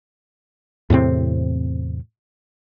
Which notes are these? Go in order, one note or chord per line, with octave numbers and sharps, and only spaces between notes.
E2 A2 C3 C4